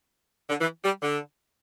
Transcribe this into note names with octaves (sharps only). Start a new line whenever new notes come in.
D3
E3
G3
D3